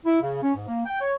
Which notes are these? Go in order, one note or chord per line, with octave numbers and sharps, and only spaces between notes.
E4
C#3
C#4
G#2
A#3
G5
C#5